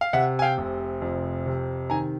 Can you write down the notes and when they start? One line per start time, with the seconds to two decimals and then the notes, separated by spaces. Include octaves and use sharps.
0.01 F5
0.13 C3 E5 F#5
0.39 G#5
0.42 F5 G5
0.58 F1
1.02 F2
1.46 C3
1.90 D#3 G#5 A#5